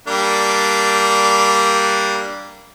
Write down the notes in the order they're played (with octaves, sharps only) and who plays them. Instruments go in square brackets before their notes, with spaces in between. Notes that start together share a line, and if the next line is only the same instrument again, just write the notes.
[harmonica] G3 A#3 D4